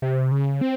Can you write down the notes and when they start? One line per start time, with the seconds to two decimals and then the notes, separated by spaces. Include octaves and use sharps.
0.02 C3
0.31 C#3
0.61 C4